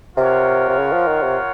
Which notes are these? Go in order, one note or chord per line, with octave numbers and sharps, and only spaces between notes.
C3 F4 A#4 C#5 F#5
C3
C#3
F3
D#3
C3